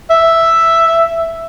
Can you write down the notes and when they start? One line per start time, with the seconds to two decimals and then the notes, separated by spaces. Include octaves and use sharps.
0.10 E5